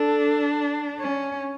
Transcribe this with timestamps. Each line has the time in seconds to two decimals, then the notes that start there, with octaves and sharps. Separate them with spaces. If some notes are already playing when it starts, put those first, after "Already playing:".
Already playing: D4 A4
1.00 C#4